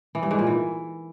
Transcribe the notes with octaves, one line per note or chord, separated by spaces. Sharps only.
E3
G2
G#2
A#2
E3